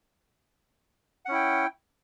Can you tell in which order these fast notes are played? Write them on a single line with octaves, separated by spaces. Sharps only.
F#5 C#4 E4 G5